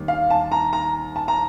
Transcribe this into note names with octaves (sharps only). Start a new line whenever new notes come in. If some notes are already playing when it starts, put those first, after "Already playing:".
Already playing: D#2 G3
F5
A5
A#5
A#5
A5
A#5